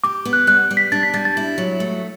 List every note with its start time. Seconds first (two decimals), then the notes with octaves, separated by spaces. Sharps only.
0.04 G4 D6
0.25 B3
0.33 F#6
0.47 G3 F#6
0.71 G3
0.77 B6
0.92 D4 A6
1.03 B6
1.14 G3 A6
1.25 A6
1.37 E4
1.58 F#3
1.80 A3